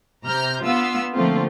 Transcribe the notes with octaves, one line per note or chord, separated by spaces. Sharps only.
C3 A#5 F6 G6
B3 D4 F4 F5 E6
D3 F3 A3 A#3 C4 F4